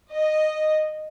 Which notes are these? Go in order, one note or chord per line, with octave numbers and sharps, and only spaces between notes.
D#5